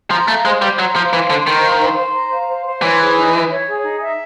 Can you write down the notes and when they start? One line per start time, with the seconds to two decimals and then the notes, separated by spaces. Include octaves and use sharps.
0.11 F3 A#5
0.28 A3 F5
0.45 G#3 C5
0.62 G3 C5
0.79 F#3 A#5
0.96 F3 F5
1.12 E3 C5
1.30 D3 C5
1.46 D#3 A#5
1.63 F5
1.81 C5
1.97 C5
2.15 A#5
2.32 F5
2.48 C5
2.66 C5
2.82 E3 C#5
2.99 G#4
3.16 D#4
3.34 E5
3.50 C#5
3.67 G#4
3.84 D#4
4.01 E5